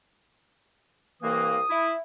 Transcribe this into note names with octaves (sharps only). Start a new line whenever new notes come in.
C2 E3 A#3 D#6
E4